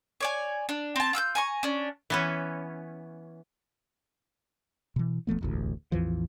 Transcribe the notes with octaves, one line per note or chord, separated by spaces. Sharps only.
C#5 D5 G#5
D4
C4 A5
F4 E6 F6 G6
G#5 A#5 C#6
C#4 D4
E3 B3 C#4
B2 E3
D#1 F3 A3 B3
E1 A1 D2
A1 E2 E3 F3